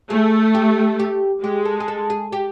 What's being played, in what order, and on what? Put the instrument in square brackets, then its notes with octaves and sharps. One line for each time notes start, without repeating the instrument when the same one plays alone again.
[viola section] A3 [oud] G#4
[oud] G4
G4
[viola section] G#3 [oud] G4
[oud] A4
G#4
A4
G#4
G4